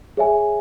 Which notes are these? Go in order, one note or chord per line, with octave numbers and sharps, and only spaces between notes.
G#4 C#5 E5 G#5